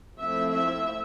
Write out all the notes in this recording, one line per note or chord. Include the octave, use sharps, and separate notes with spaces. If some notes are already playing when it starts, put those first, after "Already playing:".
F3 A3 C4 E4 E5
E5